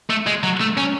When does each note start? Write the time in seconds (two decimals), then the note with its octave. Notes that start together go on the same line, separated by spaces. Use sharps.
0.10 A3
0.27 G#3
0.43 F#3
0.61 A3
0.77 C#4